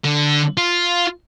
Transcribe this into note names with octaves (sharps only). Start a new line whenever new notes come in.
D3
F4